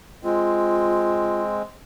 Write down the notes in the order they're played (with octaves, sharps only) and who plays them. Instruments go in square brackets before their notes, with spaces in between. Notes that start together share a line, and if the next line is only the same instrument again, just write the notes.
[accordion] G#3 C4 [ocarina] F4